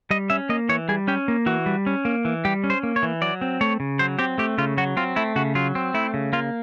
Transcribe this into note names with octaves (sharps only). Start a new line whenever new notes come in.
G3 D#5
C#4 E5
A#3 D#5
E3 C#5
G3 G#4
C#4 G4
A#3
E3 F#4
G3
C#4
A#3
E3
G3 G4
C#4
C5
A#3
C#5
E3
F#3 D5
C4
A3 C#5
C#3
F#3 C5
C4 G4
A3 G4
C#3 F4
F#3 F#4
C4 F4
A3 E4
C#3 F#4
F#3 F4
C4
A3 E4
C#3
A#3 F4